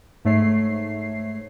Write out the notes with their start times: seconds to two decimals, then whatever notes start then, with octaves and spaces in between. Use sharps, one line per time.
0.25 G#2 A3 C#5 C7